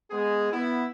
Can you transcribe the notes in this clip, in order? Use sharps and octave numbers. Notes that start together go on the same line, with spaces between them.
G#3 B3 G#4
B3 E4